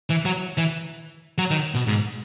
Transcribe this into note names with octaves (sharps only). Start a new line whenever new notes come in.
E3
F#3
E3
F#3
D#3
B2
G#2